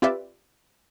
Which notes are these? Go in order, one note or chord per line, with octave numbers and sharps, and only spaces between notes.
C4 F4 G4 B4 D5 E5